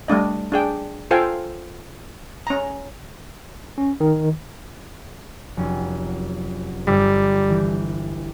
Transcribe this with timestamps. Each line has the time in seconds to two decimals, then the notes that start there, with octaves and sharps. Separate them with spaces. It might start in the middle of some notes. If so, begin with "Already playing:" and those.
0.08 G3 A3 D4 D#5
0.52 D4 G#4 G5
1.11 F4 A4 C5 F5 G5 G#5
2.47 C#4 A#5
3.78 C#4
4.00 D#3
5.57 F1 F#3 C#4
6.87 G1 G3 D6 E6
7.50 E3 G6